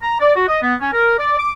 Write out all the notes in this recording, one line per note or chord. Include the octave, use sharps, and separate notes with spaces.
A#5
D5
F#4
D#5
B3
C#4
A#4
D5
D6